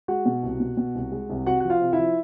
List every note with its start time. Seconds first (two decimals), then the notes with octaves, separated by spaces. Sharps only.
0.08 G#3 F#4 F#5
0.26 B2
0.43 C2
0.60 B2
0.77 B2
0.95 C2
1.12 G#3
1.29 C2
1.46 C3 F#4 F#5
1.60 F3 F#5
1.70 F4 F5
1.81 C3
1.93 E4 E5
1.99 F3